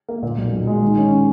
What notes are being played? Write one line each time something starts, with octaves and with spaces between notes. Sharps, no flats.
A#3
A#2
B1
B1
G#3
D#3
C#4